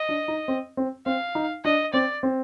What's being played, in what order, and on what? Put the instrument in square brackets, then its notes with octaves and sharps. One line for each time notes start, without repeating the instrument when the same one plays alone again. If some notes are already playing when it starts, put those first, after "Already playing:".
Already playing: [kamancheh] D#5
[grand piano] D4
D#4
C4
C4
[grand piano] C4 [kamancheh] F5
[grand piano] D#4
[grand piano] D4 [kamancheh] D#5
[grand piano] C4 [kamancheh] D5
[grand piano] C4